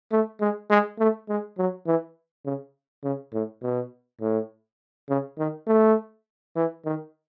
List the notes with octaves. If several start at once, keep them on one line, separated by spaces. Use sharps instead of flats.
A3
G#3
G#3
A3
G#3
F#3
E3
C#3
C#3
A2
B2
A2
C#3
D#3
A3
E3
D#3